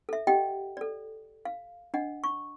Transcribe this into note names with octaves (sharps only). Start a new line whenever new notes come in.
A4 E5
G4 D#5 F#5 G5
A4 D5
F5
D4 D#5 F#5
C#6